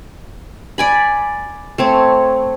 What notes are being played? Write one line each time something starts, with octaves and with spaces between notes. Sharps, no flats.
D5 G#5 B5
A3 C4 C#5